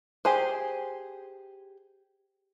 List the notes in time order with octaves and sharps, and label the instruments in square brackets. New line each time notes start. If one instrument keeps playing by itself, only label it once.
[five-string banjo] G4 G#4 C5